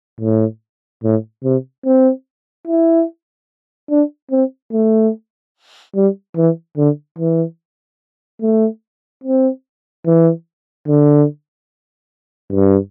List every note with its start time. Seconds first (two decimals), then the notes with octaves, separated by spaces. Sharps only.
0.21 A2
1.03 A2
1.44 C3
1.85 C4
2.67 E4
3.90 D4
4.31 C4
4.73 A3
5.96 G3
6.37 E3
6.77 D3
7.19 E3
8.42 A3
9.24 C4
10.06 E3
10.88 D3
12.52 G2